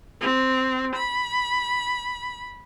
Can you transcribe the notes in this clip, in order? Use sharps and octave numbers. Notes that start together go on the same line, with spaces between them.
C4
B5